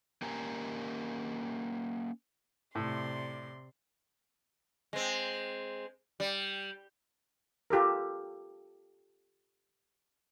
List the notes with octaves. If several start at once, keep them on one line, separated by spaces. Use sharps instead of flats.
A#3 C#4 G4 A#4 G#5 A#5
A2 C3 D5 C6
G#3 C4
G3
F4 G4 A4 A#4